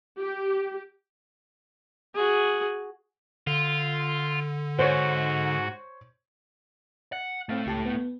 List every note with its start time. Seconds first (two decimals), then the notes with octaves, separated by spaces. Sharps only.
0.20 G4
2.15 F#4 G#4
3.47 D3 F4
4.79 G#2 F#4 C5 C#5
7.13 F#5
7.49 A2 A3 C4 F5 A6
7.66 C#2 G4 A5
7.86 B3